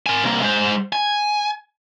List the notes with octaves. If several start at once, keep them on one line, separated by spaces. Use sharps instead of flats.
A#4 G#5
C2 A#3
G#3 C5
G#5